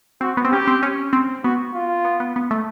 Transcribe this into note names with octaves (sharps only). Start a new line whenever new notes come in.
C4 F#4
B3
C4
C#4 G4
C4
C#4
C4
B3 F#4
F4
B3
B3
B3
A3